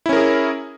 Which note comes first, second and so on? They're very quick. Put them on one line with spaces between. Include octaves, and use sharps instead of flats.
E4 C#4 A#4 G#4